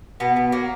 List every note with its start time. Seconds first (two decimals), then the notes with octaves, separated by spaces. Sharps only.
0.20 B2 B3
0.36 B2
0.52 F#3 A#3